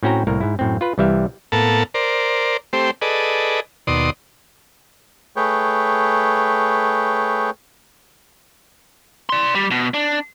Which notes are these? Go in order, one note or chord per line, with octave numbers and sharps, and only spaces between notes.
A2 C4 C#4 F#4 G5 A#5
C2 A2 A#3 A#4
G#2 E4
F#2 A2 C4
F4 B4
C2 C3 E3 G3 E5 F5
A2 A#3 B3 A4 A5
A#4 C5 D5
A3 C4 G4 C5
G#4 A4 B4 D5 D#5
D#2 B2 D5 C6 D#6
A3 G#4 B4 C#5 G5
D5 C6
G3
B2
D4